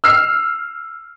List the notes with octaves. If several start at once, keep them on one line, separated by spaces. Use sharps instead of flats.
E6 F6 C7